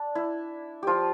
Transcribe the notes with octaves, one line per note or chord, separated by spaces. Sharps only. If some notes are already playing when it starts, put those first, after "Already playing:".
Already playing: D4
E4
F3 F4 G4